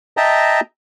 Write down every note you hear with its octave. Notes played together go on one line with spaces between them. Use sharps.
D#5 E5 G5 A5 A#5